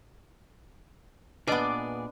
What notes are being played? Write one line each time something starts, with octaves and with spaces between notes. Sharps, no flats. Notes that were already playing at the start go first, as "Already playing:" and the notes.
A#2 B3 D4 G#4 B4 D5 D#5 D6